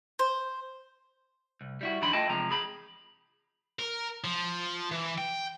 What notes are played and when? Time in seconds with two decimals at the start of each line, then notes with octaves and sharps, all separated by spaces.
0.19 C5
1.61 C2
1.81 G3 E4 F#4
2.02 F2 D#3 G3 D4 B5 C6
2.13 A3 F4 A4 D#5 G5 A5
2.29 E2 C3 F3 G#3 A#5
2.51 G#4 B5
3.79 A#4
4.24 F3
4.91 E3
5.18 G5